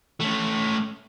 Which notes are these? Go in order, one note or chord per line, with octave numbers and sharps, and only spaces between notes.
A3 C#4